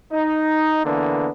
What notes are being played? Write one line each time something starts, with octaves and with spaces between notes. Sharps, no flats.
D#4
D3 E3 A#3 B3 D4